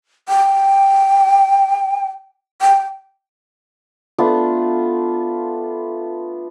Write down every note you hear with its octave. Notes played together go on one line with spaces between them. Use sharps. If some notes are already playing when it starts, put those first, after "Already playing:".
G5
G5
A3 B3 D4 F4